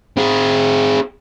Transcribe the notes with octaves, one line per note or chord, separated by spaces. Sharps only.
C4 G#4